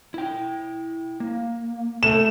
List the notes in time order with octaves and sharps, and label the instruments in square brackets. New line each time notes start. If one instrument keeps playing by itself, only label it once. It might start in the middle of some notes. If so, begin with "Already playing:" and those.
[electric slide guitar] E4 G5
A#3
[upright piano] A3 E7